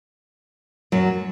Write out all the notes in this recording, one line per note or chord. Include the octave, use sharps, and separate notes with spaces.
F#2 F#3